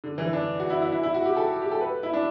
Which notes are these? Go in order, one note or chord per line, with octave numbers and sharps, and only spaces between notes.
D3
E3
D4
F#4
E4
E4
E4
E4
F#4
G4
A4
G4
A4
B4
E4
D4